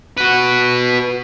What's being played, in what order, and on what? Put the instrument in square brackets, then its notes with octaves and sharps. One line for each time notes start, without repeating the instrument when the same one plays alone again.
[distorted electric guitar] F#4 B4